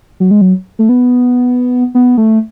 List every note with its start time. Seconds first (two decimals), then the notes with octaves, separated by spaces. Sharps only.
0.20 F#3
0.31 G#3
0.41 F#3
0.79 A3
0.89 B3
1.95 B3
2.18 A3